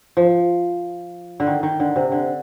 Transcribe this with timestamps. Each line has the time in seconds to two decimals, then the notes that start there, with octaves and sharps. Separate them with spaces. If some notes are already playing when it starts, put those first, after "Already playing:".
0.17 F3
1.40 D3
1.47 D#3
1.63 D#3
1.80 D3
1.96 C3
2.12 D3